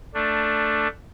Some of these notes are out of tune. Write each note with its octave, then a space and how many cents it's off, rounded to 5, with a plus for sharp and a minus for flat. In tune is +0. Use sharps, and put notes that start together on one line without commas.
A3 +10 D4 +0